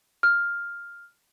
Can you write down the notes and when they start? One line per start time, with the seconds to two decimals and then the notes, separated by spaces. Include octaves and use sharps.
0.23 F6